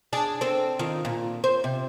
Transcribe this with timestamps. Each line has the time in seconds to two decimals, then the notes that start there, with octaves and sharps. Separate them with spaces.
0.13 D4 G#4
0.41 C4 A4
0.79 D#3 F4
1.05 A#2
1.44 C5
1.64 C3